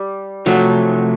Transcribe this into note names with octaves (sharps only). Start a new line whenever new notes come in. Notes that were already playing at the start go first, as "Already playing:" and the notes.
Already playing: G3
C3 F3 F#3 A3